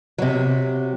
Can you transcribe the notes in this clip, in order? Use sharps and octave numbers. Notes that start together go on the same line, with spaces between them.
C3 F#3